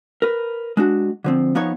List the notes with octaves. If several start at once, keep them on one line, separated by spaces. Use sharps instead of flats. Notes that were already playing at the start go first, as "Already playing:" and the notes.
A#4 B4
G#3 D4 F#4
D3 F3 C4
F3 B3 D#4 C#5